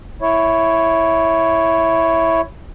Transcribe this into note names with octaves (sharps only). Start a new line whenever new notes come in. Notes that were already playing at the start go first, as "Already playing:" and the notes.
E4 C#5